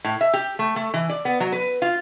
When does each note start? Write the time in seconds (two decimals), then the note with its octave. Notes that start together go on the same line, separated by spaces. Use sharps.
0.04 A2
0.21 E5
0.33 G4
0.59 A3
0.76 A3
0.94 E3
1.10 D5
1.25 B3
1.40 F#3
1.52 B4
1.82 F4